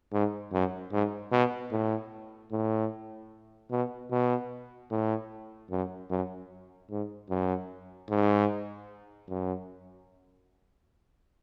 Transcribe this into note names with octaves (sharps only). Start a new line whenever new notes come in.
G#2
F#2
G#2
B2
A2
A2
B2
B2
A2
F#2
F#2
G#2
F#2
G#2
F#2